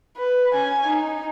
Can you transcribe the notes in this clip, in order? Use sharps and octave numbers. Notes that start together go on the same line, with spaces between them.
B4
C#4 G#5
D#4